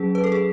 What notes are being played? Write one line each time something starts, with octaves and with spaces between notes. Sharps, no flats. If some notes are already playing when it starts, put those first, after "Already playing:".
Already playing: F#3 C#4 G#4
B4
A4
G#4